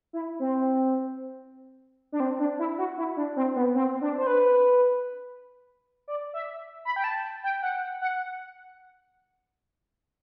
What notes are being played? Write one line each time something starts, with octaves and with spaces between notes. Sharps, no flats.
E4
C4
D4
C4
D4
E4
F#4
E4
D4
C4
B3
C4
D4
C5
B4
D5
E5
B5
G5
A5
G5
F#5
F#5